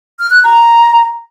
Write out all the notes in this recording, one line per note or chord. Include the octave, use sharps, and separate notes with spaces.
F6
F#6
A#5